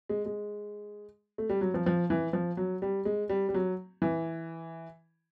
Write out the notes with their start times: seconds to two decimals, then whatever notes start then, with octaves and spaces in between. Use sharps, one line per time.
0.09 G#3
0.26 G#3
1.38 A3
1.49 G3
1.61 F#3
1.74 F3
1.86 F3
2.10 E3
2.33 F3
2.57 F#3
2.82 G3
3.05 G#3
3.29 G3
3.49 G3
3.54 F#3
4.02 E3